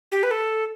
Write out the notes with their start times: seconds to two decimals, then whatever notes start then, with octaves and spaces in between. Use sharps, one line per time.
0.12 G4
0.23 B4
0.31 A4